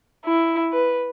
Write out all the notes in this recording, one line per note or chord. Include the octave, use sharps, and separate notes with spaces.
E4
B4